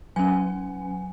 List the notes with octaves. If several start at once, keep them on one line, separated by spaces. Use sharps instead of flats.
F#3 C#4 G#5